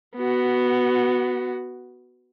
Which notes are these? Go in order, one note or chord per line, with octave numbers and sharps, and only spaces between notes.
B3 F#4